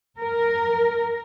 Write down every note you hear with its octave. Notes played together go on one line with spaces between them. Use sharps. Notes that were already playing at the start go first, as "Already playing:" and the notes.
A#4